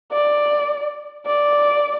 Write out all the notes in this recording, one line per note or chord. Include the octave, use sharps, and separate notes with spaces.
D5
D5